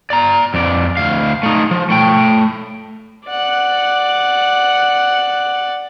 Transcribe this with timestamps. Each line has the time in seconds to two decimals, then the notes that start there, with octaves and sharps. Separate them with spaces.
0.10 D5 A#5
0.54 F2 D5
0.97 D2 F5
1.43 A3 D#4
1.71 F3
1.90 A3 G5
3.29 D5 F#5